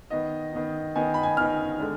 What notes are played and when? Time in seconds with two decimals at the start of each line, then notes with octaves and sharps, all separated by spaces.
0.10 D#3 B3 D#4 D#5
0.53 D#3 B3 D#4
0.96 D#3 B3 D#4 G#5
1.14 B5
1.23 G#5
1.37 D#3 B3 D#4 F6
1.80 D3 G#3 D4